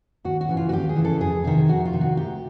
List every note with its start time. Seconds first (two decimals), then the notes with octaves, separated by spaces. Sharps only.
0.24 D#2 F#4
0.41 F#4
0.49 C#3 E3
0.57 F4
0.69 F#4
0.72 D#2 G4
0.89 G#4
0.96 C#3 E3
1.05 A4
1.20 F2 G#4
1.44 C3 D#3 G#4
1.68 F2 F#4
1.85 F4
1.93 C3 D#3
2.01 F#4
2.17 D2 G4